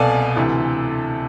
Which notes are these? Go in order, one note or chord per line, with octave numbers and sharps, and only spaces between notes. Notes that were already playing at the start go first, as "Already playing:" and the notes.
Already playing: C2 B2 B3 A4 D5 F5 G#5
D2 C3 E3